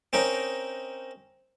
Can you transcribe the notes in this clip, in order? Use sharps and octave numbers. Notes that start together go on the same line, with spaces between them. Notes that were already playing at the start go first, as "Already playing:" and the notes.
C4 C#4 D#4 A#4